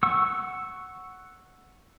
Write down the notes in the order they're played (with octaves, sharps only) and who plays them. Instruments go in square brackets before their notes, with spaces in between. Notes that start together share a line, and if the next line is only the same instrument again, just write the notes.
[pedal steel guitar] F#5 C#6 E6